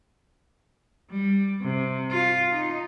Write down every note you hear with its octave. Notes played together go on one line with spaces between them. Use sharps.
G3
C3
F4
D#4